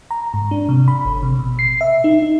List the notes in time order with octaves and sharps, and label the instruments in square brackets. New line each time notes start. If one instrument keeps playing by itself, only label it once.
[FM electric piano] A#5
G#2
D4
C3
B5
G#1
C3
B2
C7
E5
D#4
D#4